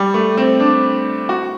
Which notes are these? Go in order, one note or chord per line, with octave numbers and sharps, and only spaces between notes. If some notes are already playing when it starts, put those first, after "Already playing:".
Already playing: G3
A3
C4
D4
F#4